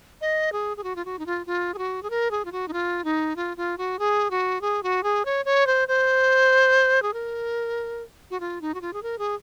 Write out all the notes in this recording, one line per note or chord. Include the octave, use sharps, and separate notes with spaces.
D#5
G#4
G#4
F#4
F4
F#4
D#4
F4
F4
G#4
F#4
G#4
A#4
G#4
F4
F#4
D#4
F4
D#4
F4
F4
F#4
G#4
F#4
G#4
F#4
G#4
C#5
C#5
C5
C5
G#4
A#4
F#4
F4
D#4
F#4
F4
G#4
A#4
G#4